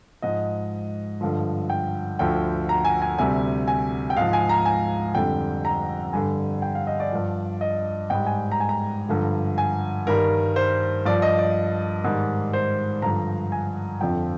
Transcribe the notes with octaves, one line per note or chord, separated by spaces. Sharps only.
G#2 F3 D#5
G2 D3 F3
G5
D2 D3 F3 G5
A#5
G#5
G#5
D2 C3 G3 G#5
G#5
G5
G#2 F3 F5
G#5
A#5
G#5
F2 D3 G3 G5
A#5
G2 D3 G3 G#5
G5
F5
D#5
D5
G2 F3
D#5
G#2 G3 G5
G#5
A#5
G#5
A#5
G2 D3 F3
G#5
G2 D#3 G3 A#4
C5
G2 F3 D5
D#5
D5
G#2 D#3 G3
C5
G2 D3 F3 A#5
G#5
F2 D3 F3 G5